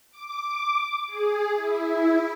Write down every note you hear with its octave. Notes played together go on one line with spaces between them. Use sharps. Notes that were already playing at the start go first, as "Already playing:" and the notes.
D6
G#4
E4